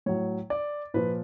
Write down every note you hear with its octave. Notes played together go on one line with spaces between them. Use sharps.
A2 F#3 C#5
D5
A#2 F3 B4